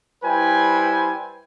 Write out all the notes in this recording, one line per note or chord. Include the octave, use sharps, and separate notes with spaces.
G3 E4 B4 C5 G5 G#5